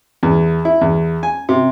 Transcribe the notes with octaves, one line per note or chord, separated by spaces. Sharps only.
E2
E4
E2
G#5
C3